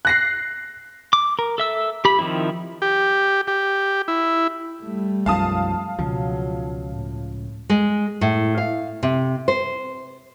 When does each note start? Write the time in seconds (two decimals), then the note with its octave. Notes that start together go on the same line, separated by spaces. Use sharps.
0.05 F#6 A#6 C7
1.13 D6
1.39 A#4
1.58 A4 E5 E6
2.05 G4 B5
2.19 D#3 F3 C4 E4
2.82 G4
3.47 G4
4.08 E4
4.84 G3 A3
5.26 B1 F#2 F3 F5 A5 D#6
5.99 C#2 B2 F3 F#3
6.91 A2
7.69 G#3
8.21 A2
8.58 F5
9.03 C3
9.48 C5